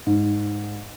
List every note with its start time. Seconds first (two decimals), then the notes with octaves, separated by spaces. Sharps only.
0.07 G#2